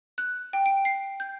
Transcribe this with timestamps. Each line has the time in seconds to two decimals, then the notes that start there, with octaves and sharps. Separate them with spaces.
0.18 F#6
0.53 G5
0.66 D7
0.85 C7
1.20 G6